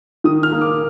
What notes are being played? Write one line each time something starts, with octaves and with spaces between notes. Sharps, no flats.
D#3 D#6
F6
A#3
D6